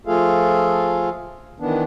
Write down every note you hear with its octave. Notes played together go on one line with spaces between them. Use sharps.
F3 A3 F4 G#4 A4 F5
D#3 E3 B3 D4